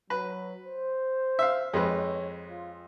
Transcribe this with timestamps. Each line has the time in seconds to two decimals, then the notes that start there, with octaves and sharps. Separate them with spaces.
0.10 F#3 B4
0.66 C5
1.39 E5 F5
1.74 F2 G#3 B4 C#5
2.48 F4